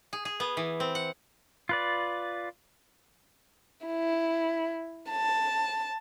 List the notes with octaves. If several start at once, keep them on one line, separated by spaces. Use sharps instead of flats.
G#4
G#4
B3
E3
C4
F#5
F4 B4 D5
E4
A5